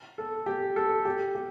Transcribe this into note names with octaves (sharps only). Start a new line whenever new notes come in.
A4
G4
A4
G4
G4